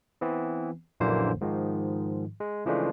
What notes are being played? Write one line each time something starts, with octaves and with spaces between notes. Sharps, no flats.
E3 B3 C4
A#1 F#2 D3 E3 A#3 C5
G#2 D#3 F3
G#3
C#3 E3 F3 G#3 A3 D4